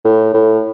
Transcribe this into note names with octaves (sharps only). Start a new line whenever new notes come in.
A2
A2